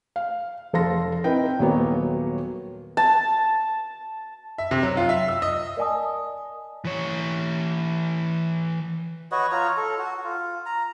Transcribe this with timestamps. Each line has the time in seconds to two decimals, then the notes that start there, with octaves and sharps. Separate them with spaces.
0.16 F5
0.73 F1 A4 F5 C6 A#6
1.24 C4 D#4 E4 A#4 B4 G5
1.59 D#1 F#3 A#3 B3 C#5
2.97 A5
4.58 E5
4.71 C3
4.83 F#3
4.97 F4
5.09 E5
5.28 E6
5.42 D#5
5.77 A#4 D5 D#5 G#5 A5 D#6
6.85 E3 C#5
9.32 F#4 B4 C#5 D#5
9.51 F4 C#5 A#5
9.77 A4
9.99 F#4
10.24 F4
10.66 A#5